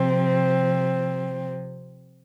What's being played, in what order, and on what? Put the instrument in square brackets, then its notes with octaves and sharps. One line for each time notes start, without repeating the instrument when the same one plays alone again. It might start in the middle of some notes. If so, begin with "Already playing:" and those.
Already playing: [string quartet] C3 F3 C4